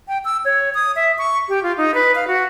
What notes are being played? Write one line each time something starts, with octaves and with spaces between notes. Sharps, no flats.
G5
E6
C#5
D#6
E5
C#6
G4
F4
D#4
B4
F5
F#4